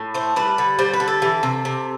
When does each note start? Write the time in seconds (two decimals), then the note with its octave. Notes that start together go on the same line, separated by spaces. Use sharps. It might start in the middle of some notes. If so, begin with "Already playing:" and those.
Already playing: A2
0.14 A3 C5
0.36 G3 B4
0.58 D3
0.79 G3 C5
0.93 B4
1.00 D3
1.08 A4
1.22 E3
1.43 C3
1.65 C3